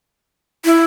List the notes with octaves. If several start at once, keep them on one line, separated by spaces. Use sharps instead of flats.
E4